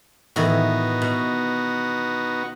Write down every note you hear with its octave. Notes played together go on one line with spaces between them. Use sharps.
A2 D#3 E3 B3 D#4 F#4
B2